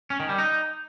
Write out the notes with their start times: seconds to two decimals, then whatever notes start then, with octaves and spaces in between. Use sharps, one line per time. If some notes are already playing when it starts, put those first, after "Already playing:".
0.10 C#4
0.20 D#3
0.29 G3
0.38 D#4